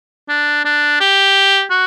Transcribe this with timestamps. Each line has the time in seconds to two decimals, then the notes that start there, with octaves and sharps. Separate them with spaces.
0.29 D4
0.65 D4
1.00 G4
1.70 F#4